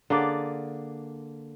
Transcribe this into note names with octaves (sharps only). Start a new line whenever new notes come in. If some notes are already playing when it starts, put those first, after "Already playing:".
D3 A#3 G#4 D5